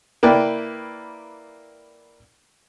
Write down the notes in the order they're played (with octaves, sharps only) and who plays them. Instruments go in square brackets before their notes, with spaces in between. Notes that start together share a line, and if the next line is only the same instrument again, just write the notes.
[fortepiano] A#3 E4 B4 D5 G5